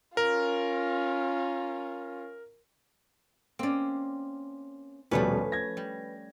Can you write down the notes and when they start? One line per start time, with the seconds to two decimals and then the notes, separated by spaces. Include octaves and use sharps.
0.17 C#4 F4 A#4
3.59 A#3 C4 C#4 D5
5.11 D#1 B2 F3 G3 A3 C#4 B4
5.52 G#6 A#6
5.77 G3